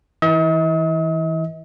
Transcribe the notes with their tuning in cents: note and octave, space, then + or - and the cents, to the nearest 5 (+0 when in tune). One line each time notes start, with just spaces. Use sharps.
E3 -25 D#5 +45